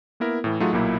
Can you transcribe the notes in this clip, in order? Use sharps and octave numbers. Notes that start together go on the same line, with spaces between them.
A#3 B3 E4 A#4
A2 E3
F#3 A3 D#4 F4 F#4 G#4
B1 A#2 F#3 A#3 E4